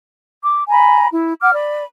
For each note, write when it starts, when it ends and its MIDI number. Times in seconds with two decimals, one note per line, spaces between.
0.42 0.63 86
0.69 1.07 80
0.69 1.07 82
0.69 1.07 83
1.11 1.35 64
1.42 1.52 78
1.42 1.52 86
1.42 1.52 89
1.53 1.84 74
1.53 1.84 83